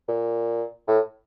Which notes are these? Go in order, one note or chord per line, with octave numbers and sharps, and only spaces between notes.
A#2
A2